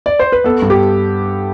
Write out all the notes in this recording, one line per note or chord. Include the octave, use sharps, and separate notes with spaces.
D5
C5
B4
B3 A4
G2
G4